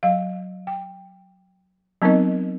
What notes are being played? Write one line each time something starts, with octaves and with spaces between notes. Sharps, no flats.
F#3 F5
G5
F#3 B3 C4 D#4 A#4 D#5